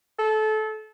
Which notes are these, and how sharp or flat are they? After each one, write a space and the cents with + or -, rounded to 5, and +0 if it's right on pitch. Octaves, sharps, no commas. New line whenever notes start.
A4 -25